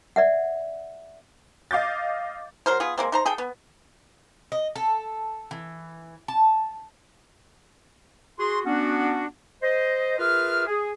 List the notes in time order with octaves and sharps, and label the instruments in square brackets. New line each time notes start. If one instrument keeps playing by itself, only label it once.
[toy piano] D5 E5 F#5
[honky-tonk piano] D#5 F5 D6 G6 A6
[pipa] F#3 A#4 C5
B3 F4 G#4
G#3 A#3 C4
D#4 C5 A#5
G#4 A4 G5
B3
[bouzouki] D#5
A4
E3
A5
[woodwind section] F#4 G#4 C6
B3 C#4 D4 F#4
C5 D#5
F4 G#4 A#4 B4 E5 F6
G#4